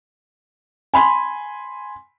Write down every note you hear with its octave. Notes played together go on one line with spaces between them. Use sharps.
G#5 B5 C6